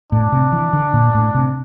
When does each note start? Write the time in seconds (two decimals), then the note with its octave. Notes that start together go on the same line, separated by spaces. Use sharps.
0.12 A2 D4
0.32 C3
0.52 E3
0.73 D3
0.93 A#2
1.14 A2
1.35 C3